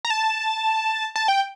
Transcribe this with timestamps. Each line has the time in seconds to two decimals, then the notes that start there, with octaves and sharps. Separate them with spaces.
0.05 A#5
0.10 A5
1.16 A5
1.28 G5